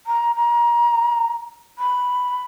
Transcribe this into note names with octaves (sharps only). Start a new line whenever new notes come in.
A#5
A#5
B5